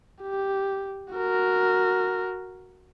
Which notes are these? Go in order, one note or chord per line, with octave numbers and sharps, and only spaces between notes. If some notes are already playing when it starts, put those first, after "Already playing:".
G4
F#4 A#4